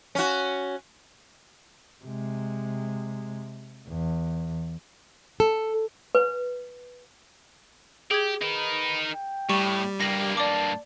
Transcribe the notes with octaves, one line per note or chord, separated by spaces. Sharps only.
C#4 F#4
C3 G#3
E2
A4
B4
G4 G#4 G#6
D#4 A#4 B4
G5
A2 G3 C#6
G2 A#3 G4 A#6 F#7
D5 A5 D6